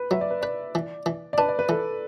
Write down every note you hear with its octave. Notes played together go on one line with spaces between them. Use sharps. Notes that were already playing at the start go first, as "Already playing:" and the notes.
Already playing: B4
F#3 E5
D5
B4
B4 D5
E3
E3
D5
D4 B4
D5
B4
E3 A4